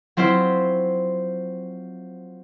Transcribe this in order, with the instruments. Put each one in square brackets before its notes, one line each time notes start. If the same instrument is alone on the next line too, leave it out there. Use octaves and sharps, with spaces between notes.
[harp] F#3 C4 E4 F4 C5 E5